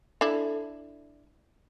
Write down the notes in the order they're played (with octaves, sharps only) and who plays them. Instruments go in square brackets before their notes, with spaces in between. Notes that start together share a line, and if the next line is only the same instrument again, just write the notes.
[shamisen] D4 E4 [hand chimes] A4